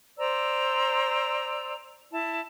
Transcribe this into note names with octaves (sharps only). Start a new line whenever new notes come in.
C5 D5 A#5 E6
E4 A5